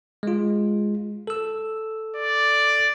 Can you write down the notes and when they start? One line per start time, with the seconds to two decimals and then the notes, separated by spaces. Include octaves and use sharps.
0.23 G#3 F4
1.27 A4 E6
2.16 D5